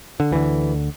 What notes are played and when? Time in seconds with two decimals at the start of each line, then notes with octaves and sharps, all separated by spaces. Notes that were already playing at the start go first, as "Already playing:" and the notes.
0.20 D3
0.31 D2 D3 E3